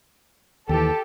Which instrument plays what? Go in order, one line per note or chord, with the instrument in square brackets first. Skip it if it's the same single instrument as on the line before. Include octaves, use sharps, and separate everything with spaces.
[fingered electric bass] D#2 E3 [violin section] G4 A4